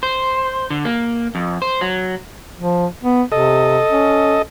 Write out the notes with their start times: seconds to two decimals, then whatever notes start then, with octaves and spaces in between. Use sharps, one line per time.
0.03 C5
0.70 D3
0.85 A#3
1.35 F2
1.62 C5
1.81 F#3
2.60 F3
3.03 B3
3.32 C3 A4 D#5
3.92 C#4